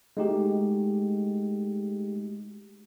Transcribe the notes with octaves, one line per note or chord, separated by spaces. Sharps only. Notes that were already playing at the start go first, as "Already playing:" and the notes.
G#3 A3 D#4 F#4 G4